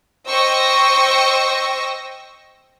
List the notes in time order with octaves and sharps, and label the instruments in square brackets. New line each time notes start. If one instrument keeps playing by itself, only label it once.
[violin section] C5 D#5 G5 C#6 E6 A#6